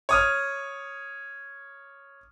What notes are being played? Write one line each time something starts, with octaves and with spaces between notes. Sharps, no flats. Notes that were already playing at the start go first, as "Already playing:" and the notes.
C#5 D#6 F6